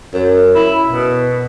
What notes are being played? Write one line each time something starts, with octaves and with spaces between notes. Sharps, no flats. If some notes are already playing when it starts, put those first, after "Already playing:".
F#2
E4
B2